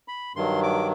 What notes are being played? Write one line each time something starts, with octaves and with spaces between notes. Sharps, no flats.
B5
G2 D#3 F#3 C6
D6